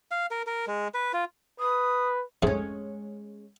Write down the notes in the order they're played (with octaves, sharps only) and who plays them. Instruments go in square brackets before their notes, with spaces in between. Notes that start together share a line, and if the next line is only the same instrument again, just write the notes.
[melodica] F5
A#4
A#4
G#3
B4
F4
[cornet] B4 [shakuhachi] D#6
[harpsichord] F2 G#2 A3 [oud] G#3 C#4